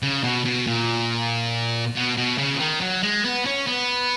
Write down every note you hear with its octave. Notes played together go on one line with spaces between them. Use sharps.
C#3
B2
B2
A#2
B2
B2
C#3
F3
D#3
F#3
G#3
B3
C#4
B3